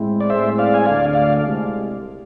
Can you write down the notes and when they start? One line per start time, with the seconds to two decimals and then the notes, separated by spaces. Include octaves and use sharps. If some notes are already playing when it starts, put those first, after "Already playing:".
Already playing: A2 G#3 C4 E4
0.20 D5
0.30 A2 G#3 C4 G#4 C5 E5
0.58 D5 F5
0.74 G#5
0.86 D2 D3 A3 D5 F5
1.13 D5 F5
1.42 C2 C3 G#3